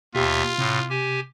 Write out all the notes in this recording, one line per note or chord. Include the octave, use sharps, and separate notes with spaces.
D#2 B2 F4 G4 E5
A2 C3
G4 G#5